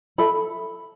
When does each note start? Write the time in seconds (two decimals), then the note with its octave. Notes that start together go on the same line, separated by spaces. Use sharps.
0.18 A4 E5 B5